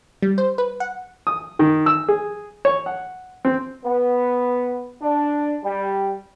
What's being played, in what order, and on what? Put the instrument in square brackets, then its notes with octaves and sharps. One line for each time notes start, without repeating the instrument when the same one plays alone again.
[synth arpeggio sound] G3
C5
B4
F#5
[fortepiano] D#6
D#3
E6
G#4
C#5
F#5
C4
[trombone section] B3
D4
G3